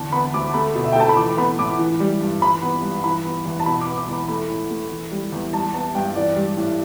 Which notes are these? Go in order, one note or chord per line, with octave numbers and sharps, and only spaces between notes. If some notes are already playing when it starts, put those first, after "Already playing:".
Already playing: E2 D3 A5
B3 B5
D2 D6
A3 B5
B2
E5
G5
A3 A5
B5
E3 D6
B3 B5
A2 D6
E3
G3
G2
E3 B5
B3
G2
E3 B5
B3
E2
A5
B2 B5
D6
B3
D6
E2 B5
A3 B5
A2
A3
E3
G3
E2
G3 A5
B3 A5
G2 G5
E3 D5
G3
A2